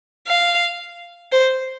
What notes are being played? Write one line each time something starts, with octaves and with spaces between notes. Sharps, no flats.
F5
C5